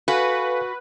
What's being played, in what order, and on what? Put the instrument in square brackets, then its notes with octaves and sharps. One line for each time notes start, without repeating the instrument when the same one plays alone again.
[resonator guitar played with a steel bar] F#4 [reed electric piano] A4 F5 G#5 [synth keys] B4